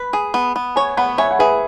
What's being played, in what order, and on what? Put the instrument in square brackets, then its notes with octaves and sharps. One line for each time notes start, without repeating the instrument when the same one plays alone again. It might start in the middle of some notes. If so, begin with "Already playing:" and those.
Already playing: [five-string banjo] B4 [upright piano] B5
[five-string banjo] G#4
B3
B3
[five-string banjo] C#5 [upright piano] G#5 C#6
[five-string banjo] B3 [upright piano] F#5 B5
[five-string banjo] C#5 [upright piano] E5 G#5
[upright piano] F#5
[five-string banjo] G#4 [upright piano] B4 E5